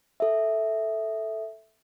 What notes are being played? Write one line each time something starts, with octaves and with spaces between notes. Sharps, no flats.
A4 E5